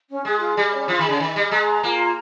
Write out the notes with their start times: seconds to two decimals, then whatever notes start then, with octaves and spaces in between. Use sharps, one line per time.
0.10 C#4
0.25 G#3 G#4
0.40 F4
0.57 G3 D#5
0.73 C#4
0.88 F3 F4
0.99 D#3
1.05 C#3 G#4
1.19 D#3 D#5
1.35 G3 D#5
1.51 G#3 A#5
1.68 A#5
1.83 A#3 F4
1.99 A#5